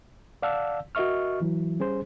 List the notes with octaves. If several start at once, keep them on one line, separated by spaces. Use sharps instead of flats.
D5 F5 F#5 A5 E6
F#4 A#4 D#5 E5 C#6 F6
E3 F#3 E4
G3 C#4 G#4 C5